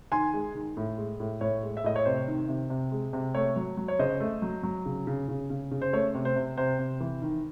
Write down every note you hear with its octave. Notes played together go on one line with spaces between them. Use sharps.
D#3 G#5 C6
G#3
D#3
A2
G#3
A2
A2 C#5
G#3
E5
A2 D#5
C#5
C3 C5
D#3
C3
C3
G#3
C3
A3 C#5
F#3
F#3
C#5
C#3 C5 D#5
A3
F#3
F#3
C#3
C#3
C#3
C#3
C#3
C5
A3 C#5
C3
C5
C3
C3 C5
C3
E3
D#3